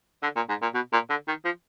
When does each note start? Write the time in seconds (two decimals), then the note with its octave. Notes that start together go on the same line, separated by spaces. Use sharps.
0.23 D3
0.36 A#2
0.49 G#2
0.62 A#2
0.74 B2
0.93 A#2
1.10 D3
1.28 D#3
1.45 F3